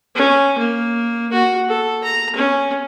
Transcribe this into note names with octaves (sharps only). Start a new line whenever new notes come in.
C#4
A#3
F#4
A4
A#5
C#4